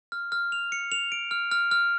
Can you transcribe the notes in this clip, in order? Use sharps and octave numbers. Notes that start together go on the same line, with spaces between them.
F6
F6
F7
C#7
F7
D7
F6
F6
F6